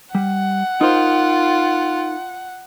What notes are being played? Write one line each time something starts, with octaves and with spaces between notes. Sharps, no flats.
G3 F#5
D#4 F4 A#4 C5